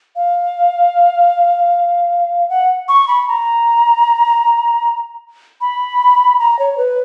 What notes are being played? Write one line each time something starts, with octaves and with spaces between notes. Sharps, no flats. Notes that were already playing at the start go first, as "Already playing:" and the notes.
F5
F#5
C#6
B5
A#5
B5
A#5
C#5
B4